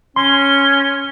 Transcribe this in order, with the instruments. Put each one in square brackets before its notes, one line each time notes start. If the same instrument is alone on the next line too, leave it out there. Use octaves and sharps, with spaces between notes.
[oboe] C#4 [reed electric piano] C6 [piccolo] G7